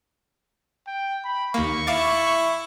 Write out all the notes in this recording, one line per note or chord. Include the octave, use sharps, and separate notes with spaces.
G5
B5
D#2 A#3 C#6
E4 F5 D6 A6